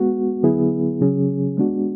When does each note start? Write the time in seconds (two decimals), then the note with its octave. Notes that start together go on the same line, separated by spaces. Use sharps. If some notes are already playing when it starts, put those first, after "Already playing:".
Already playing: G#3 B3 F#4
0.43 D3 F#3 B3 E4 G#4
1.01 C#3 F#3 C#4 G#4
1.57 G#3 B3 D4 F#4